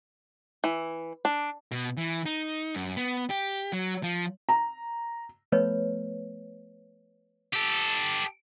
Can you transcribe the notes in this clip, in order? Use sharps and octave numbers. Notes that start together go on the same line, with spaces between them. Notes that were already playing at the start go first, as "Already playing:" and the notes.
E3
D4
B2
E3
D#4
F#2
B3
G4
F#3
F3
A#5
F3 A3 B3 B4 C#5
G4 A4